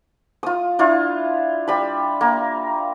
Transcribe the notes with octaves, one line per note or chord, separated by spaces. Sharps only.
F4 D#6
D4 E4 F4
G3 B5
A#3